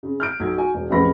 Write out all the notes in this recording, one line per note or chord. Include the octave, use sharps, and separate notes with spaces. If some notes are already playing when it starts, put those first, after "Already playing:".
C#3
F6 G6 D7
B1 G#6
F#4 G#5
E1
A1 F2 C#3 B3 B5 A#6